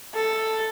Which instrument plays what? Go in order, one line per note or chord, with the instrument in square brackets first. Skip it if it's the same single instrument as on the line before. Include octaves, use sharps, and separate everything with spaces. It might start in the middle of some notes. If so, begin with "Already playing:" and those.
[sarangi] A4